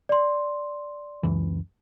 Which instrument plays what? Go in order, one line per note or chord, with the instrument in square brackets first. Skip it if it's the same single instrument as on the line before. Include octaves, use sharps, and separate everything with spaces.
[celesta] D5 C6
[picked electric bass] C#2 F#2 E3